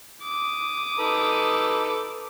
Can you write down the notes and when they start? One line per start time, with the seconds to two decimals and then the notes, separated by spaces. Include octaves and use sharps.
0.22 D6 D#6
0.99 D#4 A4 B4